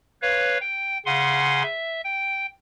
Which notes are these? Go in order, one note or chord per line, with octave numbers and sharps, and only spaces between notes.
B4 C#5 F5
G5
C#3 F5 F#5 G#5 C6
E5
G5